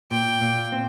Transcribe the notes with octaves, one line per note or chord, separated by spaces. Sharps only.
A#2 G5
A#2
C4